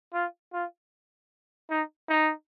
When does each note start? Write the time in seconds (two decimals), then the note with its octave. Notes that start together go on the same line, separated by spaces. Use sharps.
0.13 F4
0.53 F4
1.70 D#4
2.09 D#4